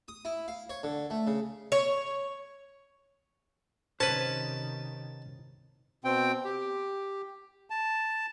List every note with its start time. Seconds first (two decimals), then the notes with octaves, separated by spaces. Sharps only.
0.08 D#6
0.25 E4
0.48 F5
0.69 C#5
0.83 D3
1.10 A3
1.27 C#3
1.72 C#5
4.00 C3 D#3 C#4 B4 C5 A5
6.04 B2 C4 G5
6.45 G4
7.70 A5